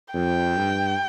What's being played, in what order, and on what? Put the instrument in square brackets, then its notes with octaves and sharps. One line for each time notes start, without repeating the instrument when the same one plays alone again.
[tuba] F2 [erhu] G5
[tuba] G2